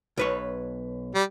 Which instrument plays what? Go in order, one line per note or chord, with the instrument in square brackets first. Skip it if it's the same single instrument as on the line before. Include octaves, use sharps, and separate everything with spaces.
[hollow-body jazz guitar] B1 B4 C#5
[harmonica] G3